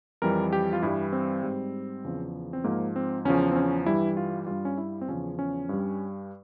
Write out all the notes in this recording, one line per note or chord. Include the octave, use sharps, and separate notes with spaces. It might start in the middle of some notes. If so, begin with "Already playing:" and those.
F2 E3 G3 A#4
G4
F4
G2 E3 G3 E4
C4
G#2 G3
E2 C#3 F3
C4
G#2 F3 A#3
C4
E2 C#3 F3 C#4
C4
C#4
G2 E3 G3 E4
F4
G2 G3 F4
C#4
E4
C4
E2 C#3 F3 C#4
C#4
G2 G3